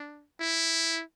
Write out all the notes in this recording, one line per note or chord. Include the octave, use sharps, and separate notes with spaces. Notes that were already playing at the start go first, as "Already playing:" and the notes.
Already playing: D4
E4